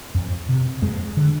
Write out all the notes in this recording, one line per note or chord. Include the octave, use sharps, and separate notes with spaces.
F2
C3
F2 G#3
D3